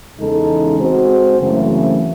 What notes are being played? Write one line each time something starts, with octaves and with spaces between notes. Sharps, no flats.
E2 C#3 G#3 D#4 A4
G#3 C4 F#4 C5
F#2 C#3 E3 A3 C4